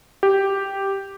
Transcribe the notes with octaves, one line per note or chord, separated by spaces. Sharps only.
G4